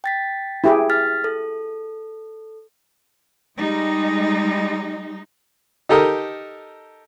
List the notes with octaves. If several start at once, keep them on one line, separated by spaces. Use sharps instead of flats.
G5 A6 B6
E4 G4 G#4
F6 A6 B6
A4
G3 G#3 D#4
D#4 G4 A4 A#4 D#5